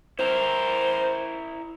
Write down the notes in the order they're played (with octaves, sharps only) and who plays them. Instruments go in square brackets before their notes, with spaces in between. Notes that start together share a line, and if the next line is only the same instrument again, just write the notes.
[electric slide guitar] E4 A#4 [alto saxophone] C5